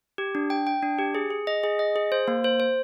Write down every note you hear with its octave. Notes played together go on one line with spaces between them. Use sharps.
G4
D4
G5
G5
D4
G4
G#4
G#4
D#5
G#4
D#5
G#4
C5
A#3
C5
C5